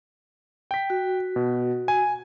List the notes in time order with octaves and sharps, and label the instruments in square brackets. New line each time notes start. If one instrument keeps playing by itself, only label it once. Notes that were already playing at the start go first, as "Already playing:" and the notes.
[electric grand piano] G5 B6
[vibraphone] F#4
[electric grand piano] B2
G#5